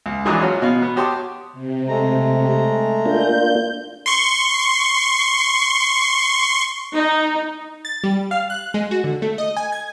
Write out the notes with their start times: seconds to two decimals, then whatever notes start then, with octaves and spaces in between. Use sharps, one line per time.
0.06 C#2
0.25 A#1 E3 F#3 G#3 D4 D#6
0.41 C#4 F4 F#4 C#5
0.62 B2 F5
0.82 B3
0.96 F#4 G4 C#5 A5 C6 D#6
1.53 C3
1.88 G#3 A3 A#5
3.06 A#3 D4 F4 G6
4.06 C6 C#6
6.95 D#4
7.85 A6
8.04 G3
8.31 F5
8.50 F#6
8.74 G#3
8.91 F#4
9.04 D3
9.22 A3
9.38 D#5
9.57 G#5
9.72 G#6